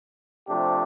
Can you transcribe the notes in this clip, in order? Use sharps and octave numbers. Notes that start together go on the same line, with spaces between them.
C3 F3 A3 D4 G4